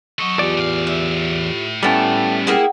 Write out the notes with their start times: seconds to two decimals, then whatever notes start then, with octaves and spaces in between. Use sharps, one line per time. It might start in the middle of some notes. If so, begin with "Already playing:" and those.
0.19 F#3 A4 D#5 C#6
0.39 E2 F4 G4 D5
0.57 A2 F5
0.87 E5
1.83 G3 A3 B3 C#4 E4 G5 A5
2.47 A#3 E4 G#4 F#5 G5